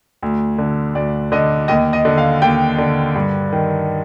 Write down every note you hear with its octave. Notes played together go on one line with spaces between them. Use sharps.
D2
D3
D2 D5
D3 D#5
D#2 D#5
D#5
D3
F5
D#2 G5
D3
G2
D#3